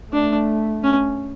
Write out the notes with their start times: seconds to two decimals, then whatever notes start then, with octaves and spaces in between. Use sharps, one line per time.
0.13 A3 D4
0.84 C#4